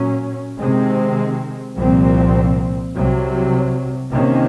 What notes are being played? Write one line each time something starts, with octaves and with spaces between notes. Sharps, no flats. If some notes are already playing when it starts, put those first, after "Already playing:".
Already playing: A#2 F#3 C#4
C3 D#3 G#3 C4
C2 A#2 F3 C4
C2 C3 F#3
C3 D#3 A#3 C#4